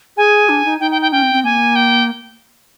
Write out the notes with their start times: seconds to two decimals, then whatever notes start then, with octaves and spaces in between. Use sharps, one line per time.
0.17 G#4 G#5
0.49 D4
0.65 D#4
0.80 D#4 G5
0.91 G5
1.02 G5
1.12 C#4 G5
1.22 C4
1.33 C4
1.44 A#3 G#5
1.76 G5